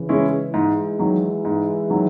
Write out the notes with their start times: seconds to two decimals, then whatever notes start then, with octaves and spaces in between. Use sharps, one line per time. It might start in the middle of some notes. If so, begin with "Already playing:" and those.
Already playing: C#3 E3
0.09 G#3 C#4 E4
0.54 G#2 E3 G#3
0.99 D#3 F#3
1.45 G#2
1.90 D#3 F#3